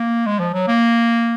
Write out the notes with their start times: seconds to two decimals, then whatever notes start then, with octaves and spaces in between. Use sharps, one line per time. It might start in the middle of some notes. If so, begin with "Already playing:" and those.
Already playing: A#3
0.26 G#3
0.39 F3
0.53 F#3
0.67 A#3